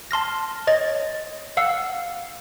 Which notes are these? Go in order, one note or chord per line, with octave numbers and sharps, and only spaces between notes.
A5 C6 F6 A#6
C#5 D#5 A6
F5 F#5 E6